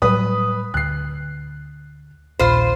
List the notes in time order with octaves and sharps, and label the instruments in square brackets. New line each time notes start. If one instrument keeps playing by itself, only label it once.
[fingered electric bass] A2 F#3 G3 [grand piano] B4 B5 D#6
[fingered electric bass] D2 [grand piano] F#6 C7
[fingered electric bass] A#1 D#2 A#2 [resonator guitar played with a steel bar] F4 C5